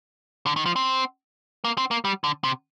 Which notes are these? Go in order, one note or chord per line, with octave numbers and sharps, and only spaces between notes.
D3
D#3
F3
C4
A#3
C4
A#3
G3
D3
C3